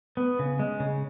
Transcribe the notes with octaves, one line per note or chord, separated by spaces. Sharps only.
B3
C#3
G#3
C#3